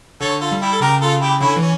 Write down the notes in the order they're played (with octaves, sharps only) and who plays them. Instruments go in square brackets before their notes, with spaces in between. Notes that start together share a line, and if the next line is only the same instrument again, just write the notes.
[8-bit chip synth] D3 [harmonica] A4 C#5
[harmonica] F4 A4
[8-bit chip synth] G3
[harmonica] E4 G4
A4
[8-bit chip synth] C#3 [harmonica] G4 A#4
[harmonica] F4 A4
E4 G4
[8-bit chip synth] D3 [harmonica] C#4 E4
[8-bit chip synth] E3 [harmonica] C#4